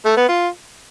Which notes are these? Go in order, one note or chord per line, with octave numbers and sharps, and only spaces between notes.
A3
B3
F4